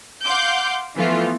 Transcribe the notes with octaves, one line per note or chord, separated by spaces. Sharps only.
F5 F#5 C6 D6 G6
E3 F3 A3 B3 F4